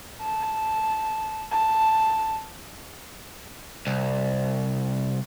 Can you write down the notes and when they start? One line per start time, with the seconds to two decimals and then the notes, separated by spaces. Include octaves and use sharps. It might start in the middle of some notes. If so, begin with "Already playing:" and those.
0.21 A5
1.51 A5
3.87 C2